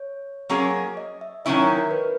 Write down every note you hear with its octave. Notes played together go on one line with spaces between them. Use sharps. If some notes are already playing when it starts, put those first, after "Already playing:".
Already playing: C#5
F#3 A#3 C#4 G#4
D#5
E5
D#3 F#3 C#4 E4 D#5
C#5
A#4
B4